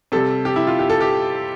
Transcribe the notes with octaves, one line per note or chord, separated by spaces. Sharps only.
C3 G3 A4
G4
E4
F4
G4
A4
G4